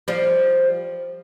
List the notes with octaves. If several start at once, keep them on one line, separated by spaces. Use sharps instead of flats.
F3 G3